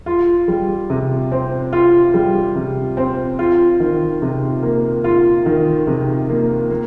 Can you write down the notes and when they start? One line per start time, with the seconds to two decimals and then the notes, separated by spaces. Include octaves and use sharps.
0.06 F4
0.48 G3
0.90 C3
1.32 C4
1.73 F4
2.14 G3
2.55 C3
2.97 C4
3.39 F4
3.80 D#3
4.22 C3
4.63 A#3
5.04 F4
5.46 D#3
5.87 C3
6.29 A#3
6.71 A#3